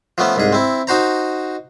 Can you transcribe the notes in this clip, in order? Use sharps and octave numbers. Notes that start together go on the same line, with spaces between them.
F3 A3 B3 C#4
C2 G#2 G#4
C4 E4
D#4 F#4 C5 A#5